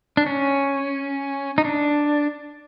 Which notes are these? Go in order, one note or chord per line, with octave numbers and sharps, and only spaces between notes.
D4
C#4
D#4
D4